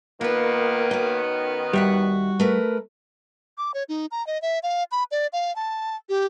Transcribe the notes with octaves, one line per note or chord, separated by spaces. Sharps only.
D#3 A#3 B3 F4 B4
C#4 F#4
D#2 G3 F#4 E5 F#5
A3 A#4 B4
D6
C#5
D#4
A#5
D#5
E5
F5
B5
D5
F5
A5
G4